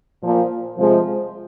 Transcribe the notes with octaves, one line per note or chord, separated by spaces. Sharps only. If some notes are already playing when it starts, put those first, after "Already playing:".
A#2 F3
C3 F3 G#3